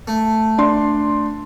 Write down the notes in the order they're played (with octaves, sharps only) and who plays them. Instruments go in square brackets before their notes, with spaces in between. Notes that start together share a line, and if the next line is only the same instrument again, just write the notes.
[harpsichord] A3
[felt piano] D4 D5 C6